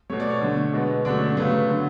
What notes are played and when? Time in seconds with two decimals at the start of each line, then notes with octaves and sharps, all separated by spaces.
0.10 B2 A3 C#5
0.20 D5
0.30 C#5
0.41 D3 A3
0.73 B2 G#3 B3
1.05 D3 F#3 A3 D4
1.16 C#4
1.26 C#4
1.37 C#3 F#3 A3 B3
1.69 D3 F#3 B3